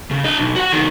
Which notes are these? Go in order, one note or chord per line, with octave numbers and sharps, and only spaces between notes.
C#3
D4 D#5
B1
F#4 F#5
C2 D#3